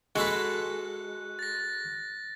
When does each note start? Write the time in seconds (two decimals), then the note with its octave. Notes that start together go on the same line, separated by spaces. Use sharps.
0.15 G#3 F#4 A4 B4 F#6
1.39 A6 A#6